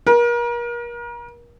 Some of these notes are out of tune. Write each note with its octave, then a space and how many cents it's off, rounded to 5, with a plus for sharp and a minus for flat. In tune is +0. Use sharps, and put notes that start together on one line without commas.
A#4 +35